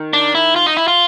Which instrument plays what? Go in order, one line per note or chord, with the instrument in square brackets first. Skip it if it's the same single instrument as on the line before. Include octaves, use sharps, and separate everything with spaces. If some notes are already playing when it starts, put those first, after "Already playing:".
Already playing: [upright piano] D#3
[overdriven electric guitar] D4
E4
F4
D#4
E4
F4